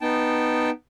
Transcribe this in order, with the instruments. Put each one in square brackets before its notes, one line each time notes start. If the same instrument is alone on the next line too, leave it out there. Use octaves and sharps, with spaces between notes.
[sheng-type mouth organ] B3 D#4 G5 A5